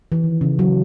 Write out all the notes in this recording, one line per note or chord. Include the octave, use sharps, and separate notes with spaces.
E3
D#3
C#3
F#3